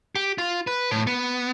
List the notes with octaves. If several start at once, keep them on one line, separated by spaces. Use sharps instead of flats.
G4
F4
B4
A2
B3